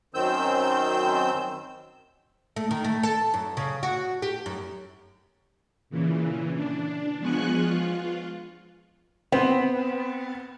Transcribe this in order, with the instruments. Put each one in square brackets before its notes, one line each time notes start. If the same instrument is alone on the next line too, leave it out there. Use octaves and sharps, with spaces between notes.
[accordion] F#2 D#3 C4 E6 G6
[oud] A3
D#3
A3
A4
F#2
C#3
F#4
G4
F#2
[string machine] A#2 C#3 E3
D4
F3 G#3 B3 G#5 C#6 F#6
F4
[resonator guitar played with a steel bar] B3 [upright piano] C4